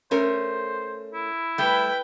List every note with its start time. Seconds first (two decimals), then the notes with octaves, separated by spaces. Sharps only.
0.11 A3 C#4 A#4 C5
1.14 E4
1.58 G3 A3 B4 G5